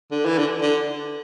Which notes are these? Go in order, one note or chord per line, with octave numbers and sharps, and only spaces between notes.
D3
E3
D3
D3